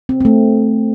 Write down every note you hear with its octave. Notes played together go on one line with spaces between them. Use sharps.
C4
C4
A3